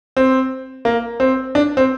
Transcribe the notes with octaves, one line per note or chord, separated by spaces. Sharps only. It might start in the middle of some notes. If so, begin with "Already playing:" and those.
C4
A#3
C4
D4
C4